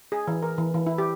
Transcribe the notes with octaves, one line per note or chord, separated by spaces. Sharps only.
G#4
E3
A#4
E3
E3
E4
G4